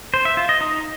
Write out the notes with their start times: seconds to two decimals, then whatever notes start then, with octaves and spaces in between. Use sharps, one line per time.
0.14 C5
0.25 E5
0.37 F4
0.49 D#5
0.61 D#4